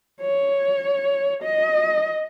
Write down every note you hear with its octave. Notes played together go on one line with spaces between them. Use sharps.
C#5
D#5